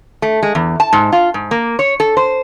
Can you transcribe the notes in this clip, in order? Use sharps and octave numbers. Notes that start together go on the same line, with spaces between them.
A3
G#3
E2
A5
G#2
F4
G#2
A#3
C#5
A4
C5